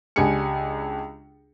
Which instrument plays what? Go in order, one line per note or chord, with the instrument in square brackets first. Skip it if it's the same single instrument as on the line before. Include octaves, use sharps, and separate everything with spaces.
[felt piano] C#2 D4 G4 G#5 C#7